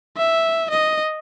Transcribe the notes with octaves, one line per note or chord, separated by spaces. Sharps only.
E5
D#5